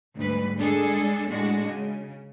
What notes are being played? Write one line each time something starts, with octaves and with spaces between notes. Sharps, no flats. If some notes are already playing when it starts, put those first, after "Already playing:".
D2 G#2 G3 B4
G#3 D4 G#4 A4
A2 G#3 D4 F#4
C#3